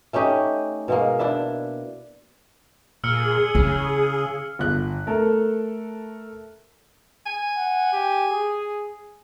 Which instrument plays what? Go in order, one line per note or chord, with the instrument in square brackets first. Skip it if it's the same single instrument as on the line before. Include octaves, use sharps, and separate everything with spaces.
[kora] A3 C#4 D#4 G4
B2 G#3 A#3
D4 E4 D5 E5
[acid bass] A#2 [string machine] G#4 [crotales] E6 F6 C#7
[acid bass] C#3 [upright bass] E4
[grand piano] G1 F#6
A3 A4 A#4
[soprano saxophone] G#5
[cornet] F#5
G4
G#4